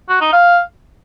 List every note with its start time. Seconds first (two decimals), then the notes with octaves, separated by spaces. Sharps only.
0.09 F#4
0.21 D#4
0.33 F5